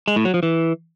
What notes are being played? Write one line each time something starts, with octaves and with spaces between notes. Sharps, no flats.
G#3
A2
F#3
F3
E3